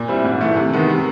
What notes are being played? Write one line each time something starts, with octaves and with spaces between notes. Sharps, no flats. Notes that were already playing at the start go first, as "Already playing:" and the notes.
Already playing: A#2
G3 C4 E4
G#2
E3 A3
C3
D#3 G#3 B3
C3